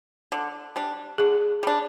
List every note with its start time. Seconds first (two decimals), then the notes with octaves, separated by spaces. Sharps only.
0.32 D3
0.76 G3 D4
1.18 D3 G#4
1.63 G3 D4